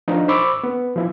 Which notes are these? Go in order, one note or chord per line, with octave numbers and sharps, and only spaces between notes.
F3 D4 D#4
C5 B5 C#6 D6 E6
B3
F3 E4